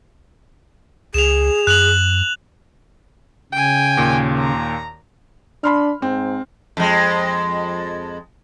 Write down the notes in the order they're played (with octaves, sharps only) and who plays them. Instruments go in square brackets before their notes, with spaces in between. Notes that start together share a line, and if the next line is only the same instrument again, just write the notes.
[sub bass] C#2 [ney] G#4 [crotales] E7 F7
[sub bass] F#2 [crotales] F#6 F7 F#7
[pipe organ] C#3 [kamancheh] G5 G#5
[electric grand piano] D#2 A#2
[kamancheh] A#5
[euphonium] D4 [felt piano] B5 C6 F6
[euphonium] G#2 [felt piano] C4
[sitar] F2 G#3